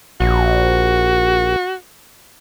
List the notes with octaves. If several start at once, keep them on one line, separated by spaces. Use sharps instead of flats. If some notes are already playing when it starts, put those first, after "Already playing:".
A#1 F#4